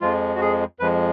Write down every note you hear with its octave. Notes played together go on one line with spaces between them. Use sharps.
F2 F3 G#3 F4
F#4
G#4
F2 F3 G#3 B4